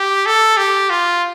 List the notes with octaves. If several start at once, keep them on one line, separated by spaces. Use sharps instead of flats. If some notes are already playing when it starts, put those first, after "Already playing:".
Already playing: G4
A4
G4
F4